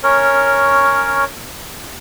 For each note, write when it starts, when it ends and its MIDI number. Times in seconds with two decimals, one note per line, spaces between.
0.03 1.24 61
0.03 1.24 70
0.03 1.24 73